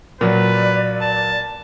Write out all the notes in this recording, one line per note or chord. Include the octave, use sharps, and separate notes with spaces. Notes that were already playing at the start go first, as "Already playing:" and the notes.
A#2 F#3 B4 D5
A5